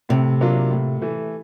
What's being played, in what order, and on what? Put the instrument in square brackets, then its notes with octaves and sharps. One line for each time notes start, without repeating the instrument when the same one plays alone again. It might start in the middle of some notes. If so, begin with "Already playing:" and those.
[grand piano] A2 [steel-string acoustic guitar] C3
[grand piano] F#3 A#3 D4 F4
A2
E3 A3